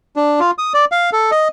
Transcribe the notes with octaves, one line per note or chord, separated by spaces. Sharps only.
D4
F4
D#6
D5
F5
A4
D#5